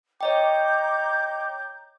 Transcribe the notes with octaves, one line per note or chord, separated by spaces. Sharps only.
C#5 D#5 G5 A#5 D6 G6